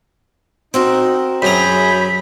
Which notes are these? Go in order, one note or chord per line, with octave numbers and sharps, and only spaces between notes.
C4 D#4 F#4 A#4
F#2 F#3 G#4 A#5 B5 G6